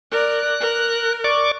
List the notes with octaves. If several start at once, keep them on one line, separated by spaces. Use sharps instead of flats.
A#4 D5 F#6
A#4
D5 C#6 D6